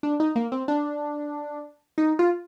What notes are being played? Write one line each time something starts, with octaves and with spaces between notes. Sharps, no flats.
D4
D#4
A#3
C4
D4
D#4
F4